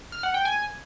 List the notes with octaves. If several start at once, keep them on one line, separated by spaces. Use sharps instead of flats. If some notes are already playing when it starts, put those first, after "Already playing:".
F6
F#5
G5
G#5